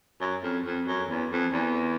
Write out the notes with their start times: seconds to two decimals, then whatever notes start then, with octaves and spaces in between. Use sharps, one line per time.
0.20 F#2
0.43 F2
0.66 F2
0.88 F#2
1.09 E2
1.32 F2
1.53 E2